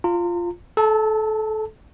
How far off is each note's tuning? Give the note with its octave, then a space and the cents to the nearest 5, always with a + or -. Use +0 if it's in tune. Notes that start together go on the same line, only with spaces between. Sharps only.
F4 -5 A#5 -35
A4 -25 A5 +25